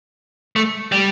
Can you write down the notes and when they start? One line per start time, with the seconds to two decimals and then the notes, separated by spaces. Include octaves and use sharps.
0.56 A3
0.92 G3